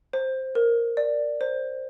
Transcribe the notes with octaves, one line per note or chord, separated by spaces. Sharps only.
C5
A#4
D5
C5